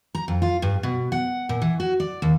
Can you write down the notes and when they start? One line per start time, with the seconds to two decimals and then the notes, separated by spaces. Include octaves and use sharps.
0.15 A#5
0.28 F2
0.42 F4
0.62 G2
0.83 B2
1.12 F#5
1.49 A#2
1.62 E3
1.80 F#4
2.00 D5
2.22 D#2